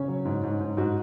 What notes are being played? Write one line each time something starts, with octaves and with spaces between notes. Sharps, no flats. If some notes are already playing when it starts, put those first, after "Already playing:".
Already playing: C#3 C#4 C#5
F#3
G#2
G#2
G#2
G#2 F#4